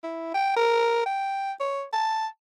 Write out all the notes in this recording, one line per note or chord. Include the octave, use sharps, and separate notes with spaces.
E4
G5
A#4
G5
C#5
A5